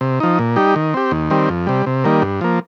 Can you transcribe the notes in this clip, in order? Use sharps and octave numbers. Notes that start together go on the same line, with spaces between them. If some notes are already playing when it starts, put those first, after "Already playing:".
C3
F3 D#4
A#2
G3 D#4 G4
D#3
C4 G4
D#2
D#3 G3 C4
F2
C3 G3
C3
D#3 G3 A#3
G2
F3 A#3